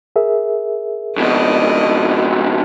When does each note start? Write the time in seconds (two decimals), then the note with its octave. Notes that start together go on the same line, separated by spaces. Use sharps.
0.16 G#4 A#4 E5
1.17 F2 B2 D5 D#5